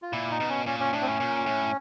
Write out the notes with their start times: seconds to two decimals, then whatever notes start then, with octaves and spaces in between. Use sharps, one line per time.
0.02 F4
0.12 A#2 E4
0.31 D#4
0.40 B2
0.49 C#4
0.66 A#2 C#4
0.80 C#4
0.92 A2 D4
1.02 C4
1.07 C#4
1.20 A#2
1.46 A2